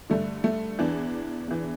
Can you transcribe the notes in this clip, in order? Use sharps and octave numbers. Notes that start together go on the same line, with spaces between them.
G2 D3 A3
A3
E2 E3 D4
E2 E3